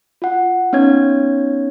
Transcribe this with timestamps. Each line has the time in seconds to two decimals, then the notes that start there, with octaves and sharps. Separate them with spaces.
0.22 F4 F#5
0.73 B3 C#4 D#4 C#5 G#6